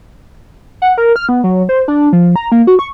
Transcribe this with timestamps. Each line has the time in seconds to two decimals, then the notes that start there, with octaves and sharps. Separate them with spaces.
0.82 F#5
0.98 A#4
1.16 F6
1.29 B3
1.44 F#3
1.69 C5
1.88 D4
2.13 F3
2.36 A#5
2.52 A#3
2.67 F#4
2.79 C#6